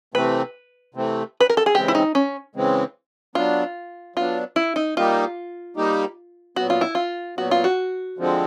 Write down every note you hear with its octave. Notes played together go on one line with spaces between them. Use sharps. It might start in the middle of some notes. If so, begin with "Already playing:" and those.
C3 E3 A3 C4 B4
C3 E3 A3 C4
B4
A#4
A4
G#4
C#3 E3 G#3 C4 G4
E4
D#4
C#4
C#3 E3 G#3 C4
F#3 B3 D4 F4
F#3 B3 D4 F4
E4
D#4
G3 A#3 D#4 F4 G4
G3 A#3 D#4 G4
A#2 F#3 B3 F#4
F4
E4
F4
A#2 F#3 B3 F#4
F4
F#4
D3 F3 G#3 C4